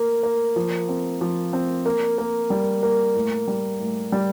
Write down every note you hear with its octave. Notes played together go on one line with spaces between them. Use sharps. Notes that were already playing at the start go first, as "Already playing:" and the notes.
Already playing: A#3
A#3
F3
C4
F3
C4
A#3
A#3
G3
A#3
A2
G3
A2
G3